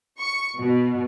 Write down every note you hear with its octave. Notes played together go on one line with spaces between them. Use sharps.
C#6
B2